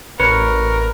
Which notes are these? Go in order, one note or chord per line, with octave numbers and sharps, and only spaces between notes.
A1 A#4 B4 C#5